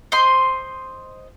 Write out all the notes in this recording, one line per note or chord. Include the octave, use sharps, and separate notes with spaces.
C5 D#5 C6